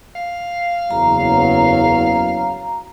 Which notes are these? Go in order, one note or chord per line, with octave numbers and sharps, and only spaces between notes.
F5
F#1 E2 F#3 A#5